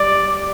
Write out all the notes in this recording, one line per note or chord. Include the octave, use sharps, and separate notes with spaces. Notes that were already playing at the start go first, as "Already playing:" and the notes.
Already playing: G3 D5